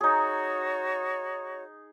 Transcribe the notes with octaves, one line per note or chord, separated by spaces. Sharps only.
D#4 F#4 G#4 C#5 C#6